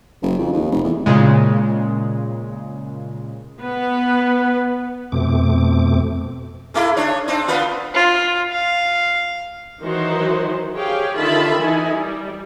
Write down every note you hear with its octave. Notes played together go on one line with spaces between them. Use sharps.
F#1
F2
D#2
F1
E2
A#2 C#3 G#3
B3 B4
F2 B2 A3 C4 D6
G#3 A3 E4
D4 D#4 C#5
C4 D4 D#4
A#3 B3 F4
F4
F5
D#3 E3 F#3 D#4 F#4 C5
G4 G#4 C#5 F5 G5
D3 D#3 F4 E5 A5 B5
E3 D#4 E4 G#5
G3